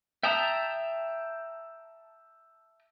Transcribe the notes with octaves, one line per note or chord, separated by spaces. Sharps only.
E5 G5 A5 A#5 D#6